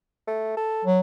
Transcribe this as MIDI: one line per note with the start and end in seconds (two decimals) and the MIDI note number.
0.27 0.53 57
0.57 0.85 69
0.85 1.00 54